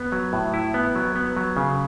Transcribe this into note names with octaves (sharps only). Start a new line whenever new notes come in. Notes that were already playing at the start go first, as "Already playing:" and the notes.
Already playing: B3
F#3
A2
E4
B3
F#3
B3
F#3
C#3